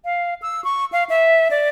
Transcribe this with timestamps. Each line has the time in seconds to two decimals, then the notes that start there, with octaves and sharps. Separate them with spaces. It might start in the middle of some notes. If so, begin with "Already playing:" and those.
0.05 F5
0.42 E6
0.64 C#6
0.92 F5
1.09 E5
1.51 D5